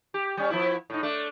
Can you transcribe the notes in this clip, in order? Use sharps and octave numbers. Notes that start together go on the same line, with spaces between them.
G4
G3 C#4
F3 B3 E4
A2 D#4
A3 D4